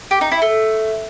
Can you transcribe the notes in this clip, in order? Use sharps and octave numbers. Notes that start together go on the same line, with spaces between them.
G4
D#4
E4
A3